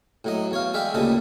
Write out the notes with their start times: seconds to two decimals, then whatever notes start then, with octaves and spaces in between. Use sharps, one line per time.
0.24 A2 F#3 D#5
0.51 E2 C#5 F5
0.74 G#3 D5 E5 F5 G5
0.94 D2 A#2 C#3 G3 A4 D#5